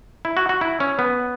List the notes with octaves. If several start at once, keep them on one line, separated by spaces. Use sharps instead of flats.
E4
F#4
F#4
E4
C#4
B3